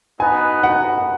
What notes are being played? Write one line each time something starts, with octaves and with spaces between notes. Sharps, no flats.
B3 D#4 F#4 B4 G#5
F#5